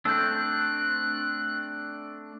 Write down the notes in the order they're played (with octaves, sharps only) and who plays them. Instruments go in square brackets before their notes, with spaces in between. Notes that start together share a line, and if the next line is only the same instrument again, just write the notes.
[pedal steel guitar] A3 C4 D4 [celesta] E6 G6 [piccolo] F#6